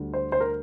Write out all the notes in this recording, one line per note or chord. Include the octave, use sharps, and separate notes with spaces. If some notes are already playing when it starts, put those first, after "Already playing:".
Already playing: D2 D3 G3
C5
C5
A#4